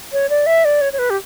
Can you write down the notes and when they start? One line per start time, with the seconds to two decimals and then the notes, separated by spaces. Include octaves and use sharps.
0.13 C#5
0.30 D5
0.46 E5
0.65 D5
0.81 C#5
0.93 C#5
0.99 B4
1.10 G4